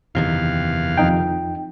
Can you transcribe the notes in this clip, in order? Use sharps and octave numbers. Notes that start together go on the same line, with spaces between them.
F#1 E2 C3 D#3 F5
F2 D#4 G5